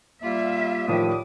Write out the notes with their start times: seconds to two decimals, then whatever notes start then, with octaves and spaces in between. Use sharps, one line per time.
0.23 G3 A#3 F4 E5
0.88 A2 D#3 F3 G3 D6 D#6